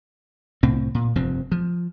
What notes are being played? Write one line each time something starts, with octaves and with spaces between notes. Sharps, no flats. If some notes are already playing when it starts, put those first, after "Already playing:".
C2 A2 C4
A#2
F1 G2 F3 C4
F3